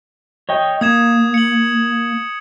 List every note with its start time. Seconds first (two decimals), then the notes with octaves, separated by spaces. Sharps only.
0.49 C#5 D#5 G5
0.81 A#3 D#6 G#6 E7
1.34 C#7 F#7